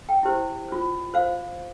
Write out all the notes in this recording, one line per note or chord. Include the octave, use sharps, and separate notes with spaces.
G5
E4 G4 C5
F4 C5
F4 C5 F5